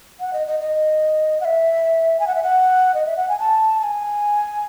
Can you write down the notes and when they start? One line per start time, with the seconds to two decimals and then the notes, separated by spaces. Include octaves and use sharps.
0.20 F#5
0.33 D#5
0.47 D#5
0.59 D#5
1.40 F#5
1.45 E5
2.19 G#5
2.27 F#5
2.35 E5
2.43 F#5
2.94 D#5
3.06 E5
3.17 F#5
3.29 G#5
3.39 A5
3.80 A5
3.83 G#5